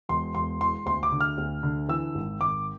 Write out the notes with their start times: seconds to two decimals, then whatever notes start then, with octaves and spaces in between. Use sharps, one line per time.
0.09 E1 C6
0.35 E1 C6
0.60 E2 C6
0.86 D2 C6
1.03 D6
1.12 D3
1.21 F6
1.38 D2
1.63 D3
1.89 E3 E6
2.15 G#1
2.41 G#1 D6